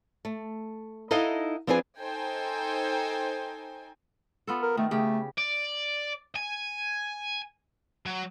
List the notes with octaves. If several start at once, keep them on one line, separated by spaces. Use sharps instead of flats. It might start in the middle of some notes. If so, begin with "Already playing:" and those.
A3
D#4 E4 A4 D#5 F5 F#5
F3 C4 D4 G#4 B4 G#5
D#4 A4 C5 G5 G#5
B3 F4 A4
A#4
D#3 A3
C#3 A3 G4
D5
G#5
F#3